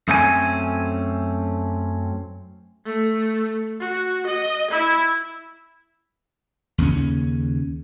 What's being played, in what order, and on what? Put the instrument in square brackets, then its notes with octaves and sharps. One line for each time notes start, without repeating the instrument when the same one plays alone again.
[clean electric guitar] F#2 A3 C4 C#4 A4 G#5
[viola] A3
F#4
D#5
E4
[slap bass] D#2 C#3 G3 C#4